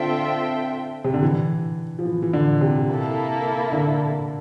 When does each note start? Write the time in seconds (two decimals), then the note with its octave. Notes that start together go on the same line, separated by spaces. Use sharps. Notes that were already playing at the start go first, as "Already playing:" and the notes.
Already playing: D3 C4 F4 A4 E5 G5
1.04 C3
1.14 D3
1.23 E3
1.99 F3
2.05 E3
2.22 E3
2.33 D3
2.61 C3
2.89 A#3 E4 A4
3.72 D3